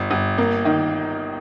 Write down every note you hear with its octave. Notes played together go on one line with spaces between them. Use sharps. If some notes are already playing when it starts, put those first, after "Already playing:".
Already playing: G1
G1
A#3
D#3